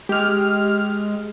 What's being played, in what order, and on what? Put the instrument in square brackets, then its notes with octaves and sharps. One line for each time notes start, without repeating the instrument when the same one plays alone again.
[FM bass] G#3 [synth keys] G4 F6